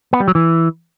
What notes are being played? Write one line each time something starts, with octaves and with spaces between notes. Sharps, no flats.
B3
G3
F#3
E3